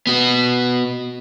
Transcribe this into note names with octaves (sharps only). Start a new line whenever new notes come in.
B3 F#4